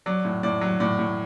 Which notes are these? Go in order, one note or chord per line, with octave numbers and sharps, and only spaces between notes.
F#3 D5
A2
A2 D5
F#3
A2 D5
A2